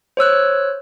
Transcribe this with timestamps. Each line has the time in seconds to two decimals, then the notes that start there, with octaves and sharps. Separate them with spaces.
0.17 C5 C#5 E6 F#6